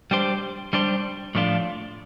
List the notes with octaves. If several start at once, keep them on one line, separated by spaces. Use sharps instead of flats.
G3 D4 G4 C5
G3 D4 G4 C5
A2 F3 A3 D4 F4